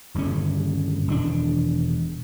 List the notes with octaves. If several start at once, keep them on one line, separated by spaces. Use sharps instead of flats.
D#1 G2 D3 C#4
E1 D#3 D4